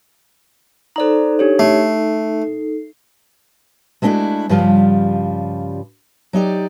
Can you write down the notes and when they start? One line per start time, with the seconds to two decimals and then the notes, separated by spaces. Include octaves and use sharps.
0.96 D#4 A4 C5 D5 A#5
1.39 D4 G4 C#5
1.59 A3 C7
4.02 G#3 A3 B3 D4 E4 F#4
4.49 G2 C#3 F3 G3 F4
6.33 F#3 D#4 G4 D5